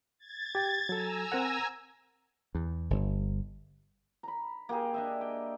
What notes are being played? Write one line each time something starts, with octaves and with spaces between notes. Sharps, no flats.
G#6 A6
G4 G5
F#3 A4 G#5 A#5 E6
C4 A#4 F#5
E2
G1
A#5 B5
A#3 G4 G#4
D4 D#5 E5
G5